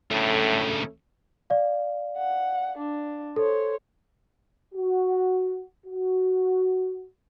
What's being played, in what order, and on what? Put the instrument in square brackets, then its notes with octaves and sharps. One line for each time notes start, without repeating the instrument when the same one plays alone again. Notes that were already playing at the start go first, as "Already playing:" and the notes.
[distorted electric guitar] D2 C#3 [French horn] A2 [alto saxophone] A3
[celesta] D5 F5
[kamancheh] F#5
D4
[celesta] A4 [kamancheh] C5 C#5
[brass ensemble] F#4
F#4